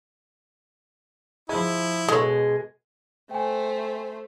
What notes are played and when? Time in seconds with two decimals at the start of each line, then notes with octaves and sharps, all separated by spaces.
1.49 F3 G#3 E4
2.08 B2 G#3 G#4 A4 C#5
3.31 A3 C5 G5 G#5